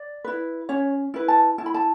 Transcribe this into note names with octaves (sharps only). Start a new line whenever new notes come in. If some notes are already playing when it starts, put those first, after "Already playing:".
Already playing: D5
E4 B4
C#4 C#5
E4 B4
A5
E4 A5
B5
A5